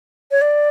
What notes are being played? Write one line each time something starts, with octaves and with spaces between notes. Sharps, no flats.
C#5
D5